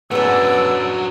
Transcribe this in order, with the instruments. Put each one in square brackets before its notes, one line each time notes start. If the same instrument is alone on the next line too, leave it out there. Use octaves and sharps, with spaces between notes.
[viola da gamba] F#2 B4 D5 [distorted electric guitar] D3 F#3 [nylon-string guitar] B3 G#4 [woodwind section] E6